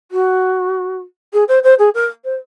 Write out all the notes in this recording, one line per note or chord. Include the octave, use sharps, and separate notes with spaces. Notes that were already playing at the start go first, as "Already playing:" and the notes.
F#4
G#4
C5
C5
G#4
A#4
C5